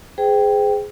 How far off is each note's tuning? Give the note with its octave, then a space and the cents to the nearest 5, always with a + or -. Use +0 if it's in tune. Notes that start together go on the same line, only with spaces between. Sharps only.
G#4 +0 C5 -35 G5 +0